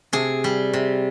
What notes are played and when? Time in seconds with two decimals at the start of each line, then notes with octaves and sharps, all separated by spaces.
0.13 C3 G#4
0.44 G3
0.73 C3